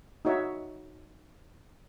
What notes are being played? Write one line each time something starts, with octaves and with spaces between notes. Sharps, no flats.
D#4 F#4 C#5 E5